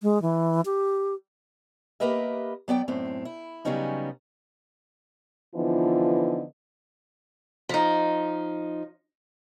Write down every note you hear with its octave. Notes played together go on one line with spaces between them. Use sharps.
G#3
E3
G4
A#3 G4 A#4 B4 D#5 E5
F#3 B3 D5 G5
F#2 A2 C4
E4
C#3 F#3 G3 B3 C#4 D#4
D3 E3 F3 B3 D#4 F4
F3 D#4